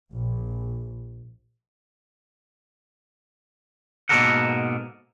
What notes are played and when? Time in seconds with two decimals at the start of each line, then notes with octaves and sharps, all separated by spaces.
0.12 A#1
4.09 G#2 B2 A#3 A4 A#4 F#5